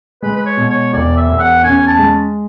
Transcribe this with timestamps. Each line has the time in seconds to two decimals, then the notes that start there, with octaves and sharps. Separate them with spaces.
0.23 G#3 B4
0.36 B4
0.46 C#5
0.57 B2
0.69 C#5
0.93 E1 D5
1.17 E5
1.29 E2
1.40 F#5
1.63 C#4 G#5
1.87 A5
1.98 G#3